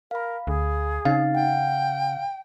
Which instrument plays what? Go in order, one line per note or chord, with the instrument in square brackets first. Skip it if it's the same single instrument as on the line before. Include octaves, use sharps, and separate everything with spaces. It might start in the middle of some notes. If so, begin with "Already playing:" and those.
[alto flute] A#4 [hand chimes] F5 B5
[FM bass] D2 [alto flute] G#4
[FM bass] C#3 [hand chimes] C4 D#4 A6 [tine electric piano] F5
[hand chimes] F#5 [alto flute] G5